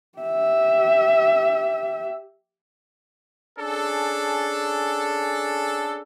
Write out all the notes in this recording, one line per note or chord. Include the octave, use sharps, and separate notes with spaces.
G4 E5
C#4 D4 G#4 A4